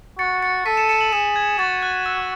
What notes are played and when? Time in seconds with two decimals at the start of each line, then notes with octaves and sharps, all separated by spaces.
0.19 F#4 A6 C#7
0.42 A6 C#7
0.66 A4 B6 D#7
0.77 C#7 E7
0.84 D#7
0.89 C#7 E7
1.01 D#7 F#7
1.12 G#4 C#7 E7
1.36 G#6
1.59 F#4 A6
1.82 F#6
2.06 E6